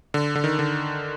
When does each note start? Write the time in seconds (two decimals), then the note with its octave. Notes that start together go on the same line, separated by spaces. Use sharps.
0.14 D3
0.35 D3
0.44 D#3
0.59 D3